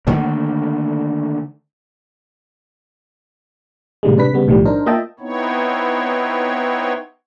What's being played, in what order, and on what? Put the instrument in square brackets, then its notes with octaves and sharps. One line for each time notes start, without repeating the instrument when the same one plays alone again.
[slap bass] D3 D#3 A3 A#3
[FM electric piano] A2 C3 D#3 G3 G#3
C3 D4 B4 B6
C#3 G3 B3
B1 A2 D#3 F3 G3
D4 D#4 A#4 C5
A#3 F4 D#5 E5 G5 A5
[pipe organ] B3 C4 D#4 E4 C#5